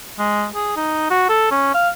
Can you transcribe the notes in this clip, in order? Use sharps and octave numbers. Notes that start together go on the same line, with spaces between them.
G#3
G#4
D#4
F#4
A4
C#4
F5